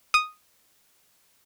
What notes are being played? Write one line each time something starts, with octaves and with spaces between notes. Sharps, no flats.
D#6